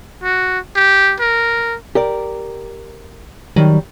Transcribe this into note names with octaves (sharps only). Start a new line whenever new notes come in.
F#4
G4
A#4
G4 A#4 D5
D#3 F#3 G3